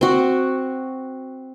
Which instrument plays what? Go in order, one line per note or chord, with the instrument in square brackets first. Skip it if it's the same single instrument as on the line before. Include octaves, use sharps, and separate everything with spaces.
[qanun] C4 F#4